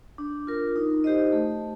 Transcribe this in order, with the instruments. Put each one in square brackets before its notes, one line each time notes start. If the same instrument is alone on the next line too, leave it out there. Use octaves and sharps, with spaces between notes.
[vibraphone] D4
F4 A#4
D#4
G4 C5 D#5
A3